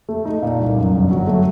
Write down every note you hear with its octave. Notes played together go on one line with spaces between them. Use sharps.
A3
D#4
A#2
C2
F#2
G1
F#3
A3